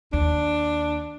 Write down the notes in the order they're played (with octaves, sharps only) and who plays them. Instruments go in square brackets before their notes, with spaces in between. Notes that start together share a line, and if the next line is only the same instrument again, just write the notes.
[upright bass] D#2 [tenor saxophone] D4